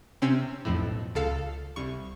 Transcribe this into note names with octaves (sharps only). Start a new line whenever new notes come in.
C3 C4 C#4 E6
B1 F2 A2
C#2 A4 F5
C2 C#6